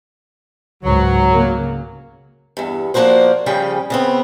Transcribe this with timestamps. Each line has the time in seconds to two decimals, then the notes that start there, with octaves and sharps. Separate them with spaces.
0.83 C#2 G#2 F#3
1.30 C#3 A#3
2.57 E2 G2
2.94 F3 A#3 D4 F#4 C5
3.46 C#3 F3 G3 C#4 G#4 G5
3.90 C#3 B3 C4